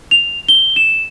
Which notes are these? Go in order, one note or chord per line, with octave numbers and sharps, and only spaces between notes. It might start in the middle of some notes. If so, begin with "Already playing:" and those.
F7
G7
E7